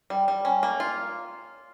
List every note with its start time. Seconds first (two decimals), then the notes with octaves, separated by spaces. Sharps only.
0.10 G3
0.28 G3
0.45 C#4
0.63 A#3
0.80 F4